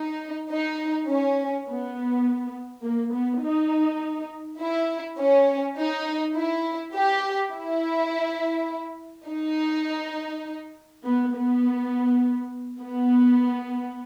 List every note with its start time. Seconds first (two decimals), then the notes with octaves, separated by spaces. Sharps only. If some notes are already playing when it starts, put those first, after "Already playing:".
Already playing: D#4
0.50 D#4
1.08 C#4
1.68 B3
2.84 A#3
3.14 B3
3.43 D#4
4.60 E4
5.19 C#4
5.77 D#4
6.36 E4
6.94 G4
7.52 E4
9.29 D#4
11.04 B3
11.34 B3
12.80 B3